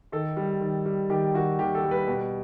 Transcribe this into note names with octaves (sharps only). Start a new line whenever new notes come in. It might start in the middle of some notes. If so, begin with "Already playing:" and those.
D#3 A4
G3
D#3
G3
D#3 G4
D#3 F#4
D#2 G4
A4
G3
B4
B2